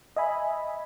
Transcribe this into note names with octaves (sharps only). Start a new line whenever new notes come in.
D#5 E5 G#5 B5